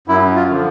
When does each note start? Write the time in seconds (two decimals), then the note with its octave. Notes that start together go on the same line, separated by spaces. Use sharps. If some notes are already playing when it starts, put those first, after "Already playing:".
0.08 F#2 E4
0.35 F4
0.49 D3 F3